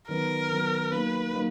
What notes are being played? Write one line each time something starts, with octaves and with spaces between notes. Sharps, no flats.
D#3 F#3 B3 A#4
D#3 F#3 B3
F#3 A#3 D#4 B4
F#3 A#3 D#4